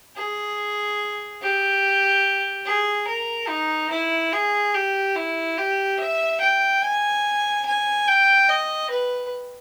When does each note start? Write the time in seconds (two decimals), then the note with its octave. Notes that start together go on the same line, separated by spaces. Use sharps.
0.16 G#4
1.41 G4
2.66 G#4
3.07 A#4
3.49 D#4
3.90 E4
4.33 G#4
4.74 G4
5.16 E4
5.58 G4
5.98 E5
6.41 G5
6.82 G#5
7.65 G#5
8.07 G5
8.49 D#5
8.90 B4